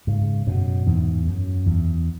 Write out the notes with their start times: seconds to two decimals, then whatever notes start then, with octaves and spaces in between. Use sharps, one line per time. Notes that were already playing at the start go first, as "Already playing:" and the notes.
0.07 G#2 C#3
0.47 F#2 B2
0.86 E2 G#2
1.26 F#2
1.66 E2